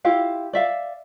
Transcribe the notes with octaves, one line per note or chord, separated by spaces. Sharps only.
E4 F4 G4 F5
D5 E5 F5